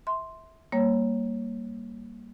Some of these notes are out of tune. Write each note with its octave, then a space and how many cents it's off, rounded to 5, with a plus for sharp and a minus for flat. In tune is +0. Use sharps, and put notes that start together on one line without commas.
E5 -25 C6 +0
G3 +0 A#3 +0 C#5 -10